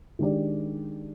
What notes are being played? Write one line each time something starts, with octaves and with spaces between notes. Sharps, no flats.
D#3 G#3 D4 G4 D5